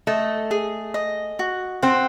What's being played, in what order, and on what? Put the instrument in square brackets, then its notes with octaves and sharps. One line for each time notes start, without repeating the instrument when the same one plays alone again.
[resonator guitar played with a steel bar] A3 [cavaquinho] D#5
[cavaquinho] G#4
D#5
F#4
[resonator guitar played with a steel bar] C4 [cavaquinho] F#5